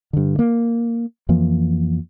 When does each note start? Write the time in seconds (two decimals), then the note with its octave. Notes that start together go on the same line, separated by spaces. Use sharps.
0.13 G2 D3
0.39 A#3
1.29 F2 E3 F3 A#3